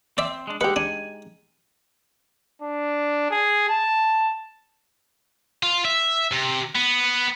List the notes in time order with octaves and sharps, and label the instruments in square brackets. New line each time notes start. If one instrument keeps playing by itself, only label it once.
[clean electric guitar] C4 [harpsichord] D5 E5
[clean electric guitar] G#3 D4
[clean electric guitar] D3 F#5 [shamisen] G#3 D#4 G4 [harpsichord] B4
[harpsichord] D4 [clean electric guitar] G#5
[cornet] D4
G#4
A5
[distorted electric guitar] F4
E5
C3
B3